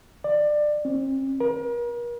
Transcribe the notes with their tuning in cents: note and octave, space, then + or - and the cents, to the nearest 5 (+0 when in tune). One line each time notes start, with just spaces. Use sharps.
D5 +20
C4 +45
A#4 +40